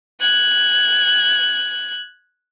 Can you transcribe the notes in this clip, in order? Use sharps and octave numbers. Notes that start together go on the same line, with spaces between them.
F#6 G#6